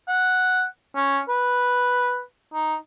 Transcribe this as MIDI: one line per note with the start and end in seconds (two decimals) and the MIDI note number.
0.08 0.64 78
0.96 1.20 61
1.29 2.21 71
2.54 2.75 63